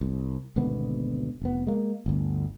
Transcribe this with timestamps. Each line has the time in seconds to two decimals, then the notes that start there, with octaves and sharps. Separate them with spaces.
0.01 C2
0.56 G#1 D2 B2 B3
1.42 F1 B3
1.67 G#3 A#3
2.06 G1 D2